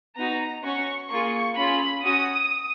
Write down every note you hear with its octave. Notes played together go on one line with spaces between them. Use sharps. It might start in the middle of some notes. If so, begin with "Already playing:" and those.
B3 D#4 F#4 A#5
C#4 F#4 C#6
A#3 F4 G#4 C#6
C#4 F4 G#4 B5
C#4 F#4 D#6